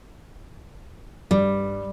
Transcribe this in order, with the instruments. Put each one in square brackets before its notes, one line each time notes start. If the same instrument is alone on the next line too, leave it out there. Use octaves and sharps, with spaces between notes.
[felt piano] G2 [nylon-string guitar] G3